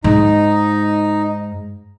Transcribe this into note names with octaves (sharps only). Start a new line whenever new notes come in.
G#2 D#4